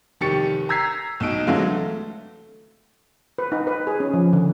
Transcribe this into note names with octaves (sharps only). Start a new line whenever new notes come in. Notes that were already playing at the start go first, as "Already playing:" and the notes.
F1 D#3 G4 C#6 A6 C#7
A#5 E6 G#6 B6 C7
B1 B2 D#4 D7
F2 D3 E3 F#3 G#3 F5
A3
B4
D#4
B4
G#4
C#4
F3
D3